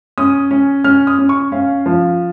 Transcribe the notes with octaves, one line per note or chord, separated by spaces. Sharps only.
C#4 D#6
C#4
C#4 F6
D#6
C#4
C#6
C#4 F5
F3